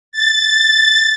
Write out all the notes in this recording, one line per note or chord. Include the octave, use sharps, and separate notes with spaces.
A6